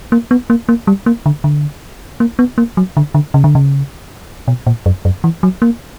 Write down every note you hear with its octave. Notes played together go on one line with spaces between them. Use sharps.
A#3
B3
A#3
A#3
G3
A#3
D3
D3
A#3
B3
A#3
F#3
D3
D3
C#3
D3
C#3
B2
A#2
F#2
F#2
E3
F#3
A#3